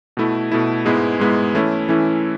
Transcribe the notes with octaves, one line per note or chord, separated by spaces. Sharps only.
B2 A3 E4
B2 A3 E4
G#2 G#3 B3 E4
G#2 G#3 B3 E4
E3 A3 C#4 E4
E3 A3 C#4 E4